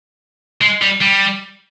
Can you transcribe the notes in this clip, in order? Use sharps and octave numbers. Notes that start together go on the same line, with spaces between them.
G#3
G3
G3